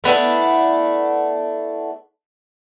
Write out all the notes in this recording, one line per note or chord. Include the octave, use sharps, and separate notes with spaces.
A3 B3 D4 E4